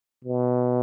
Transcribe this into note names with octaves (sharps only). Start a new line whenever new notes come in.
B2